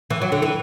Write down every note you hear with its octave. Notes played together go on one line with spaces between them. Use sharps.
E3
F#3
D3
E3